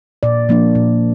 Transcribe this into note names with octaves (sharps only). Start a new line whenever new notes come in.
A#2 D5
F3 A#3 D4
A#2